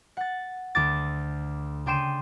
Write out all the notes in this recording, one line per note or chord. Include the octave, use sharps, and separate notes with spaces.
F#5 A6
D2 D4 A4 D6 A6
C#3 D4 G5 C6 D#7 E7